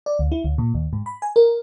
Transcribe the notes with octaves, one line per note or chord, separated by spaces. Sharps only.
D5
D2
E4
D2
A#2
D#2
G#2
B5
G#5
A#4